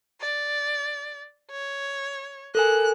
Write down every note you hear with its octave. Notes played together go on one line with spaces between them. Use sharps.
D5
C#5
A4 A#4 G#5 F#6